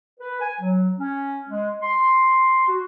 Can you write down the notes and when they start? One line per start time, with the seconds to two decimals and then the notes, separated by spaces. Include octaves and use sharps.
0.20 B4
0.41 G#5
0.61 F#3
0.99 C#4
1.50 G#3
1.82 C6
2.68 F#4